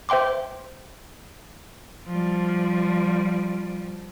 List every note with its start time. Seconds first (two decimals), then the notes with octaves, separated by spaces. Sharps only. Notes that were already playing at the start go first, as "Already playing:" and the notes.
0.09 C5 E5 G5 C6 D6
2.08 F3 G3